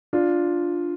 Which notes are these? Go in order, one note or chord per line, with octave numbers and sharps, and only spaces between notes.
D4 F4